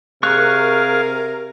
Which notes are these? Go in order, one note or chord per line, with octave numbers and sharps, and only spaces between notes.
C3 G#4 A#4 F5 C#6 F#6